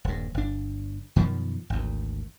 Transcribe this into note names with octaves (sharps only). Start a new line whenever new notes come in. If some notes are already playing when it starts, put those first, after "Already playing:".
D#1 G2
G1 D4
F#2 B2 D#3 F3
G#1 D2